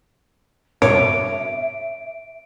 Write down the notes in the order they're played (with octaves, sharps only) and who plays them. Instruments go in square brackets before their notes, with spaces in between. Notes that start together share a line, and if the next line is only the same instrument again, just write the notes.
[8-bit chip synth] G2 B2 D6 [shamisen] C#5 [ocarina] E5 [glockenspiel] D7